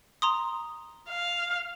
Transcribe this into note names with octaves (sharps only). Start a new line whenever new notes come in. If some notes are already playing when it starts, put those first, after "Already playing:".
A#5 C6 D#6
F5